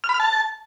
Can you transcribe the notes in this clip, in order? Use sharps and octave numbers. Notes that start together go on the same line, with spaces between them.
F6
B5
F6
A5